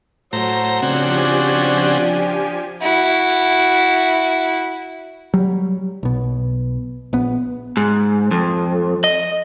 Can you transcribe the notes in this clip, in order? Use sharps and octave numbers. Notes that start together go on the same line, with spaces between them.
A2 F#3 C5 A#5
C#3 F3 C4 D4 F#4 G4 G#5
E4 F#4
F#3 G3
B1 B2
A#1 B3
G#2
F2
D#5